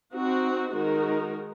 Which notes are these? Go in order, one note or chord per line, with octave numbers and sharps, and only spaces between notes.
C4 D#4 F#4
D#3 G#3 D#4 F#4 A#4